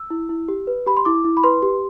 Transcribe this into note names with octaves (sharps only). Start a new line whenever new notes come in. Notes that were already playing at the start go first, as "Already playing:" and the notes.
Already playing: E6
E4
E4
G4
B4
G4 B5
C6
E4 D6
E4
B5
B4 C6
G4